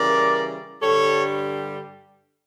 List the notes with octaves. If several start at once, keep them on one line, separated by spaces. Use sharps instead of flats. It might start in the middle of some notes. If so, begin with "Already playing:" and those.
Already playing: C#3 E3 G3 A#4 D5
G2 D3 G3 A4 C#5